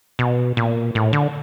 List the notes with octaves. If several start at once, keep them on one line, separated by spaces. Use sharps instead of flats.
B2
A#2
A2
D3